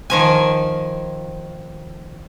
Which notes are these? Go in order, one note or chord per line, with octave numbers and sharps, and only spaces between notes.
D#3 F3 G#5